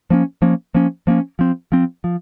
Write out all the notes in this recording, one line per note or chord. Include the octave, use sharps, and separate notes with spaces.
F3 A#3 C#4
F3 A#3 C#4
F3 A#3 C#4
F3 A#3 C#4
F3 C4
F3 C4
F3